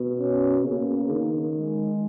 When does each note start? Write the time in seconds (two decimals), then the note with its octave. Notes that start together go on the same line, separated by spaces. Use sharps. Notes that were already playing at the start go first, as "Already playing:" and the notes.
Already playing: B2
0.19 C#4
0.65 C#3 A#3
1.11 D#3
1.57 G#3